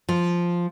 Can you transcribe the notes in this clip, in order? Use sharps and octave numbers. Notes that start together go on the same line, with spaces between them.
F3